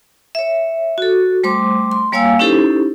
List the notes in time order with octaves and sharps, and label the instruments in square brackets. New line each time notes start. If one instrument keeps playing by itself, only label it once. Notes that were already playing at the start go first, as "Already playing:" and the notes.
[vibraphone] C#5 E5
F#4 A4
G3 A3 C5 C6 D6
C6
G3 A#3 C#5 F5 G#5 E6
C#4 D#4 E4 G4 A4 C5